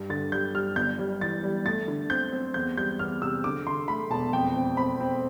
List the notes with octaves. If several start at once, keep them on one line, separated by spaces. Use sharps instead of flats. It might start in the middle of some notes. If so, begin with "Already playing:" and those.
Already playing: G2
D3 A6
G3 G6
G3 F6
G1 G6
G3
E3 A6
G3
A3 A6
D3
C4 G6
C4
E2 G6
G3 G6
E2 F6
C3 E6
D3 D6
D3 C6
A3 B5
E1 A5
F2 G5
C4
C4 B5
C4